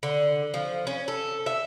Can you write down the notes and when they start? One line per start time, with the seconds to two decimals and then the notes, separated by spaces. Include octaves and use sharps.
0.03 D3
0.54 F3
0.87 C#4
1.08 A4
1.46 E5